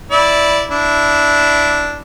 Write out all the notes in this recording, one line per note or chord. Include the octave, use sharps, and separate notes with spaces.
E4 D5
D4 E4